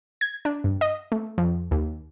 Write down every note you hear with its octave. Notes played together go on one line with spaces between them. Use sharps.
G#6
D4
G2
D#5
A3
F2
D#2